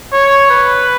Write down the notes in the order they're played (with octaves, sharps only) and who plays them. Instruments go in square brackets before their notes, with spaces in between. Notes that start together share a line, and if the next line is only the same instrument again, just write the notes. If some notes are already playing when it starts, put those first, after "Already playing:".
[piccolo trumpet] C#5
B4